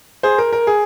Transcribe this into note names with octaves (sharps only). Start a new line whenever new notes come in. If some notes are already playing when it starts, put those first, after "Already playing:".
G#4 C5
A#4
A#4
G#4